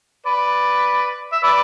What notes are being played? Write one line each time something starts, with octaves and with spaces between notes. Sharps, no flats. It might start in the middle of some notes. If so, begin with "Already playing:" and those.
B4 D5
E5
B4 D5